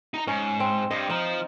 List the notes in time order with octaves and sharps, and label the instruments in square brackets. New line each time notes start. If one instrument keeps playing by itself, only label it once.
[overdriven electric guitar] D#4 A#5
[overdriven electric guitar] G#2 [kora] C#4
[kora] C4
[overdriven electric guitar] G2 [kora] D#5
[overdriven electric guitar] F3 [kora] D#4